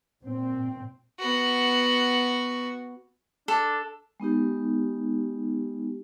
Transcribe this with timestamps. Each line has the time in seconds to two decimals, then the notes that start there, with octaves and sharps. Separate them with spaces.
0.21 A#2 C4
1.20 B3 F#4
3.48 D4 A4
4.20 G#3 B3 D#4 G4